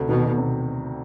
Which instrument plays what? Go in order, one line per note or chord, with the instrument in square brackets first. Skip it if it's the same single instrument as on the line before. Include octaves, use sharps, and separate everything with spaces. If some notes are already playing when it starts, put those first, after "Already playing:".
Already playing: [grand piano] D2 C3
[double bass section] B2 [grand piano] D#3
[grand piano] D2
C3